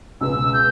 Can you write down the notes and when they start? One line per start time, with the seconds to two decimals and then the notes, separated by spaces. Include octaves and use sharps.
0.21 C#2 B2 G#3 B3 E6
0.53 G6